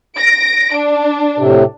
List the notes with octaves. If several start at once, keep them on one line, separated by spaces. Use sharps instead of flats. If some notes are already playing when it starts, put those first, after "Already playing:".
A#6 D7
D4
A2 C3